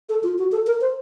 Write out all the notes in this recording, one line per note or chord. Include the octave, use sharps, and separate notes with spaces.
A4
F4
F#4
A4
A#4
C5